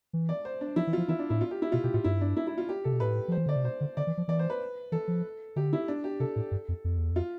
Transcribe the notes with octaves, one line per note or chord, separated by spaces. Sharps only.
E3
D5
C5
D4
F3 E4
E3
F3 F4
E3 E4
D4
A2 E4
F4
G4
E4
B2 F4
B2 G4
A2 F4
G2 E4
D4
E4
E4
F4
G4
C3 A4
B2
A2 B4
F3 C5
E3
D3 D5
C3
B2 C5
D3
D3 D5
E3
F3
E3 D5
C5
B4
E3 A4
F3
D3 G4
E4
D4
G4
C3 A4
A2
G2
F2
F2
E2
F2
F4